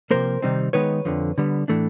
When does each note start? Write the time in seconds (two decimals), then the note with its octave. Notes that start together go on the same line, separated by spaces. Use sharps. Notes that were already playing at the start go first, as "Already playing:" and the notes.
0.11 C3 F3 A#3 A#4 C5
0.42 C3 D#3 G3 C4 D#4
0.73 D#3 G#3 B3 D#4 B4 C#5
1.05 F2 D3 F3
1.38 D3 G3 B3
1.68 A2 E3 A3 D4